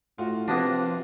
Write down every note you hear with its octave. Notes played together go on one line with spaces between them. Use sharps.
A2 F4 F#4
C3 F3 A#3 B3 D4